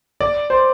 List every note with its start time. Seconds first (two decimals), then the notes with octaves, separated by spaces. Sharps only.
0.20 D5
0.50 C5